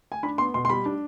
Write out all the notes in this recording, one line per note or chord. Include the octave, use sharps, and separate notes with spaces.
G#5
D4 B5
B3 C6
B2 C6
C6
G3 B5
D4